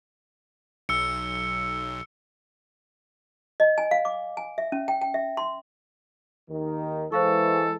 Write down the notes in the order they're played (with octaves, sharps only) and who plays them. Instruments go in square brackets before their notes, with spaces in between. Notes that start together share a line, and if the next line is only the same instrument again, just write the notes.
[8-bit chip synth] B1 [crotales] E6 C#7
[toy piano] D#5
G#5
F5
D6
G#5
E5
C#4
G5
G5
E5
C6
[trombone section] D#2 D#3
[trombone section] E3 G#3 [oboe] A4 [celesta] C5 F5 C#6